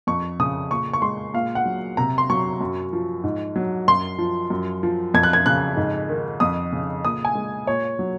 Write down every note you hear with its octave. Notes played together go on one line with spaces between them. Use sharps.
F2 C#6
C#3 D#6
A#2 C#6
C#6
G#3 C6
A#2 F5
F#5
F#3
C3 A#5
C6
F#3 C#6
F#2
F3
G#2
F#3
F#2 C6
F3
F#2
F3
F2 G#6
F#6
G#6
C#3 F#6
G#2
D#3
F2 D#6
C#3
A#2 D#6
G#5
G#3
A#2 C#5
F#3